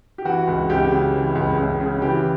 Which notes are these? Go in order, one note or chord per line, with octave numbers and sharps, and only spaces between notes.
G4
E3 F#4
C#2
C#2 G4
C#3
E3
C#2
C#2
C#3
E3 G4